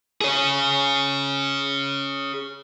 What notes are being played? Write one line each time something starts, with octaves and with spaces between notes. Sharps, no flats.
G#4 C#5